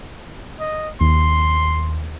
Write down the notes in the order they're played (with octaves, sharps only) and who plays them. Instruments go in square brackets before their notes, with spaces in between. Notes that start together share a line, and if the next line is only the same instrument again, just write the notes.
[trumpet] D#5
[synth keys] D#2 [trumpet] C6